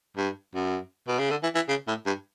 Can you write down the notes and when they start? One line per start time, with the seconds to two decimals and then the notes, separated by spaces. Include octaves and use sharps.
0.17 G2
0.55 F#2
1.08 B2
1.19 C#3
1.30 D3
1.43 E3
1.55 E3
1.69 C#3
1.88 A2
2.06 G2